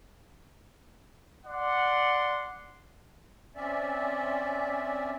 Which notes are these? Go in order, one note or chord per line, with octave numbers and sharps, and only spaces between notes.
D5 F#5 C6
C4 C#4 D5 E5